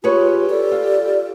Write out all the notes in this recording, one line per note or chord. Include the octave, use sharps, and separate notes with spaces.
F4 G4 G#4 B4 C#5
A4 D5
F4